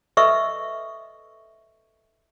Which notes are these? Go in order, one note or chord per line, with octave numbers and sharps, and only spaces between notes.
A4 B4 D#5 E5 C#6 E6